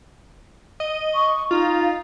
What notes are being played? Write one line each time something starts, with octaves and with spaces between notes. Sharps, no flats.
D#5
C#6
D#4 F4